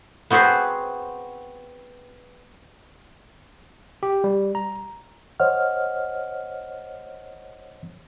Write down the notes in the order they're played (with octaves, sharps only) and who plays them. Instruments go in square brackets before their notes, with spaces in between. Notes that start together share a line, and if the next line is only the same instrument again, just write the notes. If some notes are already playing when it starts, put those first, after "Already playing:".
[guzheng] B3 C4 F#4 G#4 B4 C5
[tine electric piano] G4
G3
A#5
[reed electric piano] C5 C#5 D#5 F#5 F6